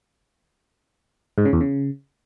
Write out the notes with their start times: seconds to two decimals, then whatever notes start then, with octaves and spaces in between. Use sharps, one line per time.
1.38 G#2
1.45 C#3
1.53 E2
1.61 C#3